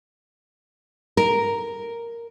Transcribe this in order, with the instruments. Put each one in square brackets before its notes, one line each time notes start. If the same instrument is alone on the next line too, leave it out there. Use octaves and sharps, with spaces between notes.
[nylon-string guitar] A#4